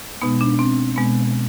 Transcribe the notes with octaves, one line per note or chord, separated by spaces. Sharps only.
B2 G#3 B3 D#4
D4
C4
B2 G#3 B3